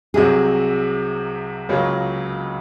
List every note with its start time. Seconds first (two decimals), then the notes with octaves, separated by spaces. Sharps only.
0.14 C2 C3 F#3 C4 G#4
1.69 C#2 C#3 F#3 A#3 C#4